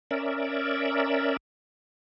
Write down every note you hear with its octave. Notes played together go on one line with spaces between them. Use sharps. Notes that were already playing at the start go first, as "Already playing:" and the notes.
C#4 A#4 D5 E5